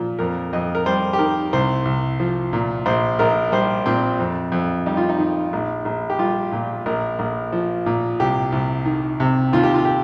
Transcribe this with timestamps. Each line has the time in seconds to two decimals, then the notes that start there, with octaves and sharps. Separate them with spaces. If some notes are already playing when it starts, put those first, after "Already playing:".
Already playing: A#2 F3
0.19 F2 A#4
0.53 F2 D#5
0.75 A#4
0.86 G3 C5
1.13 G4
1.18 D#3 A#4
1.53 C2 C5
1.85 C2
2.20 F3
2.53 A#2
2.86 A#1 C5
3.19 A#1 A#4
3.52 G3 C5
3.86 A#2 C4
4.19 F2
4.52 F2
4.86 G3 D#4
4.97 F4
5.09 D#4
5.19 D#3
5.53 A#1
5.85 A#1
6.10 G4
6.19 G3 F4
6.52 A#2
6.86 A#1 A#4
7.19 A#1
7.52 F3
7.86 A#2
8.20 C2 G4
8.52 C2
8.85 D#3
9.20 C3
9.53 D#2 F4
9.63 G4
9.74 F4
9.85 G4